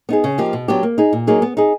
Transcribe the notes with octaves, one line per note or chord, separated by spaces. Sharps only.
B3 D#4 G#4
C#3
F3 A#3 D#4 G4
B2
F#3 B3 D4 G4
A#3
D#4 G#4
A#2
F#3 A#3 D#4 G#4
B3
D#4 G#4